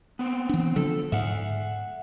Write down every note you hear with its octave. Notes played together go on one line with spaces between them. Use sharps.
B3 C4
E3 D4
D3 F3 A4
G#2 E5 F#5